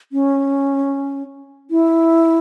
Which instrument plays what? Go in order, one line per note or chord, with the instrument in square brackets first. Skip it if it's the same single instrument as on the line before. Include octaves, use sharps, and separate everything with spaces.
[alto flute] C#4
E4